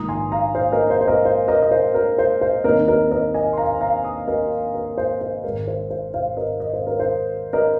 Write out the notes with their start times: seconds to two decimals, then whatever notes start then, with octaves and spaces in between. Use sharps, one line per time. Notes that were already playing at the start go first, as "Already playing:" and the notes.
Already playing: A#1 G#2 D#3 A#5 D#6
0.09 G#5 C6
0.32 F5 A#5
0.55 C5 F5
0.72 A#4 D#5
0.90 C5
1.01 C5
1.07 A#4 D#5
1.25 C5
1.48 A#4 D#5
1.63 D#5
1.71 C5
1.94 A#4
2.18 C5
2.41 C5
2.64 D#2 D#3 C4 A#4 D#5
2.88 A#4 D#5
3.11 A#4 D#5
3.34 D#5 G#5
3.53 C6
3.57 F5 A#5
3.81 F5 A#5
4.04 A#5 D#6
4.28 A#4 D#5
4.74 A#4
4.98 C5
5.21 C5
5.44 G#1 G#2 G#3 A#4
5.67 C5
5.90 C5
6.14 C5 F5
6.37 A#4 D#5
6.60 D#5
6.73 C5
6.87 A#4
7.00 C5
7.53 A#4 D#5